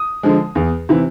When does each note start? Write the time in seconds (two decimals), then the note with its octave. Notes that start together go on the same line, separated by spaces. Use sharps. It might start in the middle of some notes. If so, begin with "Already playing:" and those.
Already playing: D#6
0.23 D3 F3 G#3
0.55 E2
0.89 C3 E3